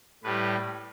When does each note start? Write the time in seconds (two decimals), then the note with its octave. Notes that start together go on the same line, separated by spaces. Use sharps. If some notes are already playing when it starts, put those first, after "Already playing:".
0.23 A2 G3 B4